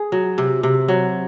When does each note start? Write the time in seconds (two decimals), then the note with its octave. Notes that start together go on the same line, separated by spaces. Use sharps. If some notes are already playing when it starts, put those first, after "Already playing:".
Already playing: G#4
0.12 F#3
0.38 C3
0.63 C3
0.88 F#3